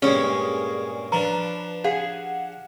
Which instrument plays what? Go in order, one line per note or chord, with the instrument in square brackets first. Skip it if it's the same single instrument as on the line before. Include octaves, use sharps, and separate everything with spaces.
[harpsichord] G2 A#2 G#3 [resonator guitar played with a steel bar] C#4 C#5 [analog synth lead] G#4
[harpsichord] F3 D4 [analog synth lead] B4 [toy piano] A#5
[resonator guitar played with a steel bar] G#4 [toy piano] F5 [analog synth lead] F#5